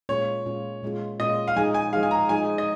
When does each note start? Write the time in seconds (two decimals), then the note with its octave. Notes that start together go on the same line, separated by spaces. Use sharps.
0.09 A#2 G#3 C#4 F4 C#5
0.46 A#2 G#3 C#4 F4
0.83 A#2 G#3 C#4 F4
1.20 A#2 G#3 C#4 F4 D#5
1.48 F5
1.56 F3 G#3 D#4 G#4 G#5
1.74 G#5
1.93 F3 G#3 D#4 G#4 F5
2.03 G#5
2.11 A#5
2.29 F3 G#3 D#4 G#4 G#5
2.58 D#5